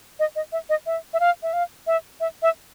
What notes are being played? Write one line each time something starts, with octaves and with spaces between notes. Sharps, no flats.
D#5
D#5
E5
D#5
E5
E5
F5
E5
F5
E5
E5
E5